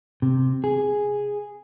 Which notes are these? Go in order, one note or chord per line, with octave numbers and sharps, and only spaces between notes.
C3
G#4